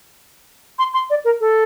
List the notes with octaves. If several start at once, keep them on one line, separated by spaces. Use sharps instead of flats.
C6
C6
D5
A#4
A4